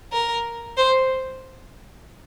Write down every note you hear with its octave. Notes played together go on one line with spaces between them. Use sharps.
A#4
C5